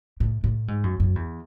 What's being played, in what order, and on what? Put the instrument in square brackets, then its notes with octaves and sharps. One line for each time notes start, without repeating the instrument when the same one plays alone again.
[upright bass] A2
A2
G#2
F#2
F#2
E2